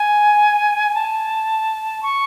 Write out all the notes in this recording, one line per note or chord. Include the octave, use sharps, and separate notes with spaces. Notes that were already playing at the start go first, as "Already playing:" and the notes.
Already playing: G#5
A5
C#6